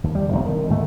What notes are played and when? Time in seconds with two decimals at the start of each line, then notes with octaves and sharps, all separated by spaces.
0.04 D#2
0.15 G3
0.29 E1 A#1
0.46 D#3
0.68 D2 G#2 A3